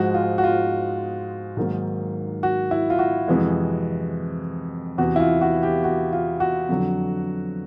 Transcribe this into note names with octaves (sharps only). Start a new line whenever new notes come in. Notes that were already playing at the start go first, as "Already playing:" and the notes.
Already playing: G#2 F3 G#3 F#4
F4
F#4
F4
G#2 D#3 F#3 A#3
F#4
E4
F4
F#4
F2 C3 E3 G#3
E2 C3 E3 F#4
E4
F4
F#4
G4
F#4
F4
F#4
F2 D3 F#3